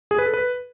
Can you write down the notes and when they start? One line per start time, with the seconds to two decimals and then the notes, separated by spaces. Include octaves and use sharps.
0.11 G#4
0.18 B4
0.26 A4
0.34 B4